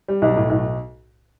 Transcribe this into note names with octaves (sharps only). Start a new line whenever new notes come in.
G3
B1
A2
B1